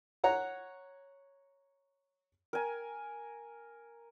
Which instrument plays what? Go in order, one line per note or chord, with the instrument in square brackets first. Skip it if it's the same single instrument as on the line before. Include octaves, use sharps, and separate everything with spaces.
[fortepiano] C#5 F#5 A#5
[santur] A#4 G#5